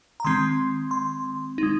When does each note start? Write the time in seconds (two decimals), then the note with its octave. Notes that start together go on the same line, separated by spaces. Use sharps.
0.20 A#5
0.25 D#3 G#3 C4 C6
0.91 C6
1.58 G#3 D#4